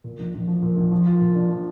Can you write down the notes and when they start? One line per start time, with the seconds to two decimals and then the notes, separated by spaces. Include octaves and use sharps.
0.04 A#2
0.19 A#1
0.34 A#1
0.48 F3
0.63 A#2
0.77 A#1
0.92 F3
1.07 F4
1.21 A#2
1.35 D4
1.50 F3